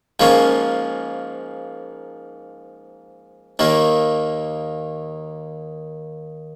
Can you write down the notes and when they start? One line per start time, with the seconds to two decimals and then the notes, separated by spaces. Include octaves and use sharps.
0.20 G#2 F3 A#3 C#4
3.59 D#2 D#3 A#3